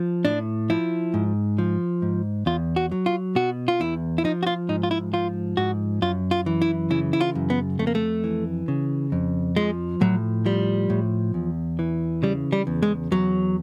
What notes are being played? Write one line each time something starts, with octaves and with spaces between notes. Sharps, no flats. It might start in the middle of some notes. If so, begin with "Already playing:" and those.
Already playing: F3
A2 D4
F3 E4
G#2
F3
G#2
E2 F4
F#4
F#3
F4
B2 F#4
F4
E2 E4
E4
F3 D#4
F#4
F4
G#2 D#4
F4
E4
F3 F4
G#2 F#4
F#2 F4
F4
E3
E4
C#3 E4
E4
F4
F#2
B3
F2 A3
A#3
A3
E3
C#3
F2
F3 G#3
A2 F#3
F3 G3
A2
E2
E3
C#3 G3
G3
E2
G#3
E2 F#3